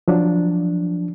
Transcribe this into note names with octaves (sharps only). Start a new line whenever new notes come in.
F3 F#3 D4